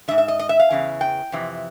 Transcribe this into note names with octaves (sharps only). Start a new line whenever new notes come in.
G#2 D#3 E5
E5
D#5
D#5
E5
F5
E2 C#3 E3
G5
F2 C3 E3